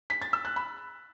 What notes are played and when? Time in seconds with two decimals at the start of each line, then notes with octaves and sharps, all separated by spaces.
0.10 B6
0.22 A6
0.33 E6
0.45 F#6
0.56 B5